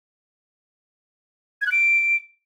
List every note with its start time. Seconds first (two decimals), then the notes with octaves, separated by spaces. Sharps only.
1.62 G#6
1.67 F#6
1.72 D7